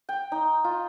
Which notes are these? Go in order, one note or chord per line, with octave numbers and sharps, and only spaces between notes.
G5
D#4
F4